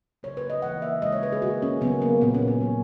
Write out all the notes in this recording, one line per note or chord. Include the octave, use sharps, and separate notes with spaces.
C#3 F#3 A#3 C#5
B4
D#5
C#3 E3 A#3 F#5
E5
C#3 G#3 D#5
C#5
B4
G#4
D#3 A#3 F#4
C#4
C#3 F#3 A#3 B3
A#3
A#2 A#3 B3
C#4
C#4
A#2 F#3 A#3